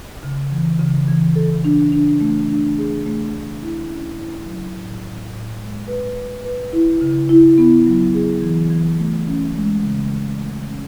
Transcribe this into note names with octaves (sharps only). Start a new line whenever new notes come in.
C#3
E3
C#3
E3
A4
D4
D4
A3
D4
G#4
A3
A3
E4
C#4
E4
F#3
A2
A2
A2
G#3
B4
B4
B4
E4
C#3
E4
B3
F#3
G#4
E3
E3
A3
C#4
G#3
C#3
G#3
A3
C#4